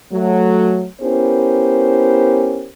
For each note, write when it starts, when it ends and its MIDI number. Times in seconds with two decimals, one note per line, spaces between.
0.12 0.86 54
0.12 0.86 57
1.01 2.68 59
1.01 2.68 61
1.01 2.68 64
1.01 2.68 67
1.01 2.68 70
1.01 2.68 72